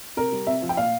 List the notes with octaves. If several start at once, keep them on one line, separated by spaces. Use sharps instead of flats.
C3 A#4
G3
C3 E5
F3
G5
A#2 F5